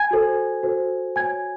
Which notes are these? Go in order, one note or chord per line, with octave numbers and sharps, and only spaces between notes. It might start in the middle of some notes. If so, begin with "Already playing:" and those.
Already playing: G#5 G#6
F#4 A4 C5
F#4 A4 C5
F#4 C#5 G#5 G#6